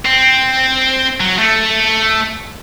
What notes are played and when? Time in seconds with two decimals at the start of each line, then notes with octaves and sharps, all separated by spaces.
0.05 C4
1.21 F#3
1.38 A3